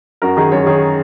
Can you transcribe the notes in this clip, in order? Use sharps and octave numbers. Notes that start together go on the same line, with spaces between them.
F#2 F#4 A#4
D#3 D#4 G#4
F#2 G#4 C#5
D#3 G#4 C#5